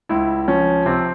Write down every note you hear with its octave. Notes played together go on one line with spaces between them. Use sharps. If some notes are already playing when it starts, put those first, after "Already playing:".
C#2 E4
F3 C#4
C3 C4